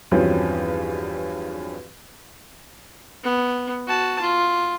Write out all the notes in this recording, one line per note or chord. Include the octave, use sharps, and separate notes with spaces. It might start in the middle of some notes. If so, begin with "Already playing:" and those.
E2 G2 F3 F#3 C4 C#4
B3
F#4 A5
F4